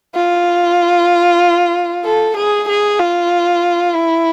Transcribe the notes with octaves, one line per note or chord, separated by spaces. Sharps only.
F4
A4
G#4
G#4
F4
E4